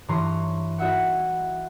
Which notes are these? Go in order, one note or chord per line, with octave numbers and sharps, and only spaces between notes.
G2 E3 C#5 A#5 C6 C#6
E4 F#4 D#5 E5 F#5